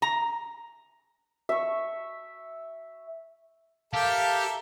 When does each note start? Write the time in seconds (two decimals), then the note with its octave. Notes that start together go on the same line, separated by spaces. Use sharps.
0.02 A#5
1.49 E5 C#6
3.94 G4 A4 A#4 E5 F5 A5